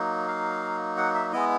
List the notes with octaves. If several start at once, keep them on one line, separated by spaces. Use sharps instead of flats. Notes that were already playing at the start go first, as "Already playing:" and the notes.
Already playing: F#3 A#3 D#4
F5
F#5
E5
G#3 B3 E4 D#5